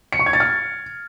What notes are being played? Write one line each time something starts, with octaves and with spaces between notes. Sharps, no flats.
C#7
C#6
G#6
A6
F6